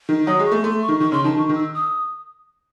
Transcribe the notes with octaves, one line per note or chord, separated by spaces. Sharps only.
D#3
F#3 D#6
G#3
C#6
A3
A3 C6
C#6
D#3
D#3 C#6
C#3 C6
D#3 A5
D#3 C#6
D#3
E6
D#6